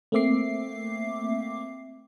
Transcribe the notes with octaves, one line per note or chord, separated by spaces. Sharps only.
A3 A#3 C4 E5 D6 C7